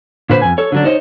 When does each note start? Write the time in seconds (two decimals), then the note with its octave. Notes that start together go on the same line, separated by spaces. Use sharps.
0.30 A#2 D3 B4 C5
0.42 F2 G#5
0.58 A4 C#5
0.72 D3 F#3 D4
0.84 D#4 C5 C#5 D#5